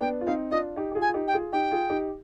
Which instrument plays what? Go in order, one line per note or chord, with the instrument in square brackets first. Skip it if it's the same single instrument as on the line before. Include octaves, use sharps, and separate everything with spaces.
[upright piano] B3 D4 [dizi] G5
[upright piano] F4
[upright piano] C4 D#4 [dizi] F5
[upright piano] D4 F4 [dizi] D#5
[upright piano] D#4 G4
G4
F4 G#4
[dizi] G#5
[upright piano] F4
D#4 G4
[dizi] G5
[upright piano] F4 G#4
[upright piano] D#4 G4 [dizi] G5
[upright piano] F4 G#4
D#4 G4